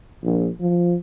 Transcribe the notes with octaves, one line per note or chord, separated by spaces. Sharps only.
A#1
F3